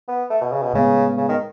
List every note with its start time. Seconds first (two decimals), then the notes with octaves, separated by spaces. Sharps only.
0.08 B3
0.30 A3
0.41 B2
0.52 C#3
0.62 B2
0.74 A2 C#3 G#3 B3
1.17 C#3
1.29 D#3